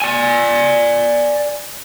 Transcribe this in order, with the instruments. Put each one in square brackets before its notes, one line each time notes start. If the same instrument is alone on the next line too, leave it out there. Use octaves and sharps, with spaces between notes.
[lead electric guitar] D5 G#5